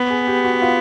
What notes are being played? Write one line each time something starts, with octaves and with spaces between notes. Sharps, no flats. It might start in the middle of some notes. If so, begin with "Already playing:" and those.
Already playing: B3
G#4
G4
F#4
F4